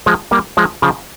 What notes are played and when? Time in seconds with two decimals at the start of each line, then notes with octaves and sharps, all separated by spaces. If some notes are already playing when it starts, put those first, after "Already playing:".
0.06 F3 G#3
0.31 G3 A#3
0.57 F3 G#3
0.82 C#3 F3